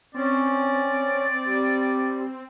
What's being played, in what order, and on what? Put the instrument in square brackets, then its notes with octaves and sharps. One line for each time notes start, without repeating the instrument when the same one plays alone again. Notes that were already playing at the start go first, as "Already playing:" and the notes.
[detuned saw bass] C4 [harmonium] C#4 [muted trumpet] D5
[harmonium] G3